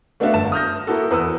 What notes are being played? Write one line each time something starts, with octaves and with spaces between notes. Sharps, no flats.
A3 B3 D4 F#4 E5 F5
G1 A5 E7
D#6 F6 G6 A#6
A#3 E4 F#4 A4
E2 B4 D#6 E6